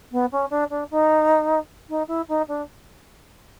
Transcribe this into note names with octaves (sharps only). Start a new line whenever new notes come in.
B3
C#4
D4
D4
D#4
D#4
E4
D#4
D4